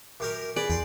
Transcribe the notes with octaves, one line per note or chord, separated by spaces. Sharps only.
F#2 G4 A#4
G#4 B4 D5
E2 G5 C6